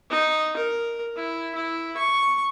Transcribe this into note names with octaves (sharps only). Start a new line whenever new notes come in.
D#4
A#4
E4
E4
C#6